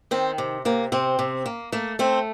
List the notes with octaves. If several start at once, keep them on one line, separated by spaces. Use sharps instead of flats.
D#3 C4
C3
C3 A#3
C3 C4
C3
A#3
A3 A#3
A3 C4